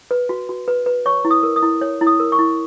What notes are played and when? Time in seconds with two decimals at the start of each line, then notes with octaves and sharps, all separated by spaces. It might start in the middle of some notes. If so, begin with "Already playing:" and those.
0.11 B4
0.29 F#4
0.49 F#4
0.68 B4
0.86 B4
1.06 C#5 C#6
1.25 E4
1.31 D#6
1.43 A#4
1.56 D#6
1.62 E4
1.81 C#5
2.01 E4
2.07 D#6
2.20 A#4
2.32 C#6
2.39 E4